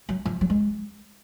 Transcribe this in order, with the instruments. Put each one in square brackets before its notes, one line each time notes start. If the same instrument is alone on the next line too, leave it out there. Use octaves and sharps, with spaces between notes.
[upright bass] F#3
F3
F#3
G#3